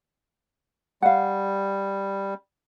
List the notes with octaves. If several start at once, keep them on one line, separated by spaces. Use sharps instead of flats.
G3 F5 F#5